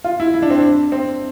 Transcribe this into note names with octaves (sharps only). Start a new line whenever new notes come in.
F4
E4
E4
D4
C4
D4
C4